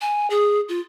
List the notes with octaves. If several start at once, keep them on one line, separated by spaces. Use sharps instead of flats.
G#5
G#4
F4